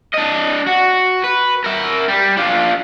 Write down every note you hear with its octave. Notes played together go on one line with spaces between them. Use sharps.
D4 D#5
F#4
B4
A#4 E5
G3
D4 F4